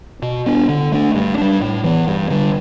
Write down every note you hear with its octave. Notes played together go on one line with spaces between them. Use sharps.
B2
B3 D4
D3
A3 D4
G2
G3 D4
A2
E3 B3
G2
D3 G3 D4